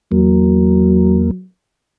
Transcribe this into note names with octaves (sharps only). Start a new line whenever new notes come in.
E2 F#3 A#3